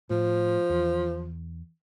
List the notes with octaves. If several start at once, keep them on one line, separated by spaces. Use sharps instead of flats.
A2 F3
E2